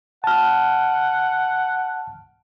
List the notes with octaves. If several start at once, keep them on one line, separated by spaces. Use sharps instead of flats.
F#5 A5 F6